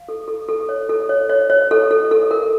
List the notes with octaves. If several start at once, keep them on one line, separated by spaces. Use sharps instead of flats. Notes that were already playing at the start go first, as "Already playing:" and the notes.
Already playing: F5
A4
A4
A4
C#5
A4
C#5
C#5
C#5
A4
A4
A4
A#4